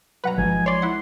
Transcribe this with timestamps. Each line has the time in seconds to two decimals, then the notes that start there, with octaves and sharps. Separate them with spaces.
0.24 G2 B2 F#3 B4 F#5 A#5
0.38 G#1 F3 G#3 C4 D#4 G#5
0.66 C#5 D5 C6
0.82 E4 F#5